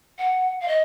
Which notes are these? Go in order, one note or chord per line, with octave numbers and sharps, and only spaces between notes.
F#5
F5
D#5